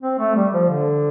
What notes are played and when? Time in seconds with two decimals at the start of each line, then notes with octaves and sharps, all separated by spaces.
0.03 C4
0.19 A3
0.36 G3
0.53 F3
0.69 D3